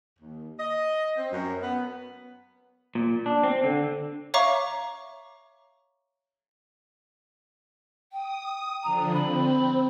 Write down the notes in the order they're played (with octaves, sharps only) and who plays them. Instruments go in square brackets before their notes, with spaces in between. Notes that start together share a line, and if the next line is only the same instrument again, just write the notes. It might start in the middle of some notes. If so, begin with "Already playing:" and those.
[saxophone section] D#2
D#5
C4
F#2
B3
[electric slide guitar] A#2
D4
C4
D3
[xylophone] C#5 E5 F5 A#5 C#6 D6
[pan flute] G5 [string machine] D#6
[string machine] D3 F3 D4 [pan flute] A#5
[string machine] C4 [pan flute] B5